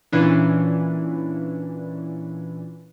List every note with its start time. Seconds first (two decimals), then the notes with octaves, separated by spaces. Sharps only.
0.12 A#2 E3 C#4 D4